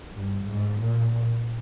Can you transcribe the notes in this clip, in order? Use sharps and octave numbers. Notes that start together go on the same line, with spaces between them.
G2
G#2
A#2